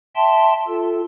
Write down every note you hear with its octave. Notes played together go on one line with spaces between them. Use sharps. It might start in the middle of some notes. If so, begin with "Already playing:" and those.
E5 G5 A5 C6
F4 A4